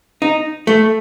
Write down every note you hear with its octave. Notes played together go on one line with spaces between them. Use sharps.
D#4
A3